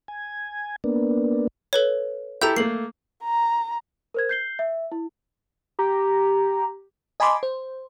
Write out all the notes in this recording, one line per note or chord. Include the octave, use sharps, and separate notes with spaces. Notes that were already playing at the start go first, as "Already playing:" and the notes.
G#5
A#3 B3 D4
A4 B4 C#5
E4 G4 A4 A#5 E6 G6
A3 A#3 C7 F#7
A#5
A#4 C5 G#6
G6 C7 G7
E5
E4
G4 A#5
D#5 G#5 A5 B5 C6 D6
C5